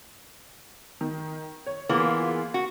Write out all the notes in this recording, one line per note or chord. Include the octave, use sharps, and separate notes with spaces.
D#3
C#5
E3 A#3 B3 F4 G#4
F#4